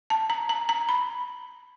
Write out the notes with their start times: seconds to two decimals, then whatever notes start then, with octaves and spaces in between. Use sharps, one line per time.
0.10 A5
0.30 A#5
0.49 A#5
0.69 A#5
0.89 B5